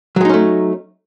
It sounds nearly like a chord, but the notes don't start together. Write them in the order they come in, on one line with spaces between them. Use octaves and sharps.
F#3 G#3 D#4 C#4 A3